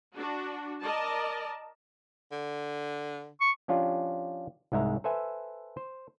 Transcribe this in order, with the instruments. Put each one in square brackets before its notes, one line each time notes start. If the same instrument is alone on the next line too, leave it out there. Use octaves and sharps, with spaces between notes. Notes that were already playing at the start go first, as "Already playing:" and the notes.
[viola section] D4 F#4
A#4 D5 D#5 A5
[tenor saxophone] D3
[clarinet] C#6
[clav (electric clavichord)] F3 C#4 D4 F4 G4
C2 G#2 G#3 E5 A#5
A4 B4 C5 E5 G#5
C5